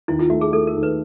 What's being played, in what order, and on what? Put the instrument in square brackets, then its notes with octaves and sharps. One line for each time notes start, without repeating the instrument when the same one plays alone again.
[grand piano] D#2 [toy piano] E4
[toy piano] F4
[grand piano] A3 [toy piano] F#4
[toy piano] G#4
[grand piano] A3 [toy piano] A4
[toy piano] A#4
[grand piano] D#2
[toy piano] B4